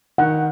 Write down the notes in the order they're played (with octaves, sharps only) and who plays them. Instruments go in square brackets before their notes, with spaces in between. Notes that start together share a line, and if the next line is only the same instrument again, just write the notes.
[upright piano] D#3 [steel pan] F#5